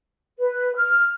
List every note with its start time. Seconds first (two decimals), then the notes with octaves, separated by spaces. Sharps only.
0.39 B4
0.76 F6